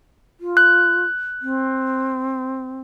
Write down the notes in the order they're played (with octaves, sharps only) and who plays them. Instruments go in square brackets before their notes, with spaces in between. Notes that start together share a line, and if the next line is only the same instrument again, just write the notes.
[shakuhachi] F4
[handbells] F#6
[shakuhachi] C4